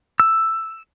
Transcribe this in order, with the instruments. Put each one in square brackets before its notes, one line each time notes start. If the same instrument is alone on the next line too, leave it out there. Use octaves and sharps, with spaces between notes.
[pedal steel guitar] E6